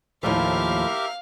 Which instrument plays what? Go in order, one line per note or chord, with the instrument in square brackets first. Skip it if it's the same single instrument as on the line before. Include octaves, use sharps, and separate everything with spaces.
[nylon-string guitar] D#2 A2 F3 [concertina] G4 A#4 E5 [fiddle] F5